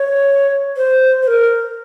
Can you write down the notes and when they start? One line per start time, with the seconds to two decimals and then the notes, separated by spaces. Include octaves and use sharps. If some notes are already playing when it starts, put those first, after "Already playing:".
Already playing: C#5
0.76 C5
1.22 C5
1.27 A#4